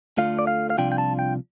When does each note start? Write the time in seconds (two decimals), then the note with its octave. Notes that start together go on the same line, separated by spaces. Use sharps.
0.17 D2 D3 A3 F4 F5
0.39 D5
0.47 F5
0.70 F5
0.78 C2 C3 F3 D4 F4 G5
0.92 G5
0.98 A5
1.19 G5